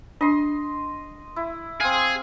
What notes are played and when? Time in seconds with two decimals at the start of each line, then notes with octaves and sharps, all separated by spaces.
0.21 D4 D#5 C6
1.36 E4
1.80 C4 G#4 F5